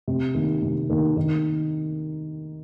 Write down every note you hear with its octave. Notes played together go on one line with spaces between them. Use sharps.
C3
D#3 A#3
C3
D#3 A#3
D#3